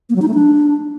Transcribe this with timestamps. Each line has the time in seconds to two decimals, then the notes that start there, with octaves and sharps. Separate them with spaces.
0.10 A#3
0.16 F#3
0.22 D#4
0.28 A3
0.34 D4